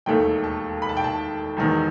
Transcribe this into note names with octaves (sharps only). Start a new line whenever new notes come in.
E1 D#2 D#3 A3 G5
A5
B5
A5
G5
A5
E1 E2 D#3